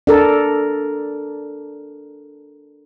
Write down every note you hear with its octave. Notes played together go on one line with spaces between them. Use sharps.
D4 A4 A#4